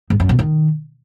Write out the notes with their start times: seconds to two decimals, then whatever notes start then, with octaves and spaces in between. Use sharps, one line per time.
0.10 G#2
0.20 F#2
0.29 B2
0.39 D#3